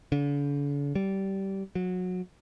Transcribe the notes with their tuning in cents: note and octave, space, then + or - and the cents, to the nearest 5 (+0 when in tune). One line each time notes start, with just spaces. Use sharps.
D3 -45
G3 -20
F#3 -25